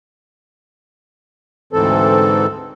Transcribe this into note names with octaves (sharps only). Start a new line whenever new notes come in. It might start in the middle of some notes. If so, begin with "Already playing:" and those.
D2 G#2 E3 C4 A4